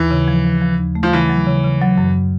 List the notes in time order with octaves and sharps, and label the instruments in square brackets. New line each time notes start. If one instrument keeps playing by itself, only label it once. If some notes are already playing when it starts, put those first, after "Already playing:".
Already playing: [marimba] D#2 [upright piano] E3
[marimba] C#3
F3
F3
F3
D#2
A3
[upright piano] F3
[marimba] C#3 [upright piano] E3
[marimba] F#3
C#3
C#3
F#3
F#2